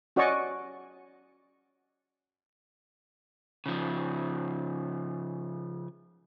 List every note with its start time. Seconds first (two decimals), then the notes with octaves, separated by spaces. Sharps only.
0.16 C#4 F#4 D5 D#5 G#5 C#6
3.66 C#3 F3